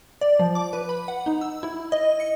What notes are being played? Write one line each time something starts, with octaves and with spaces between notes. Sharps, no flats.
D5
F3
D6
B4
B5
F#5
D#4
E6
E4
D#5
C#7